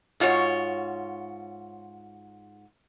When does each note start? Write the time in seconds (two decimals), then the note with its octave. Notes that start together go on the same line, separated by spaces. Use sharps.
0.20 G#2 F4 F#4 C#5